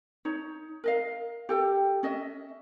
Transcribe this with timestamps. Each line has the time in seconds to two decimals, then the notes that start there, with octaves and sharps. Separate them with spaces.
0.25 D#4 C#5
0.84 A#4 D#5 F5
1.49 G4 A4 G5
2.03 C#4 D#5 E5